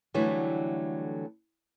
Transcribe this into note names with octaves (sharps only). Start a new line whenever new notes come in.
D3 E3 F#3 G3 A3